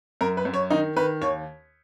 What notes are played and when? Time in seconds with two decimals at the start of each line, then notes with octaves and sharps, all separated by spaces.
0.21 F#2 A#4
0.37 B4
0.45 F#2
0.54 C#5
0.70 D#3 D#4
0.96 D#3 B4
1.21 D#2 C#5